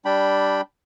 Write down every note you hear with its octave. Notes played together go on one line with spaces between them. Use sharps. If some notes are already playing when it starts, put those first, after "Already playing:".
G3 D4 G5 B5